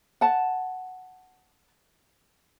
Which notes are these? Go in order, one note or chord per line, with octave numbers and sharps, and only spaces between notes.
F#5 A5